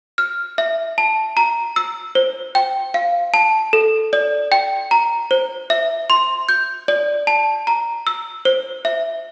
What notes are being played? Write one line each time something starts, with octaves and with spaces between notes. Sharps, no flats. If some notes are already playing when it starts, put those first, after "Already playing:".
F6
E5
A5
A#5
E6
C5
G5
F5
A5
A4
D5
G5
A#5
C5
E5
C6
G6
D5
A5
A#5
E6
C5
E5